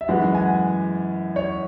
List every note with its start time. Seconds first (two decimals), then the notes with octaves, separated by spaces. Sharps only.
0.01 E5
0.08 F#2 E3 G#3 F#5
0.35 G#5
0.40 F#5
1.36 C#5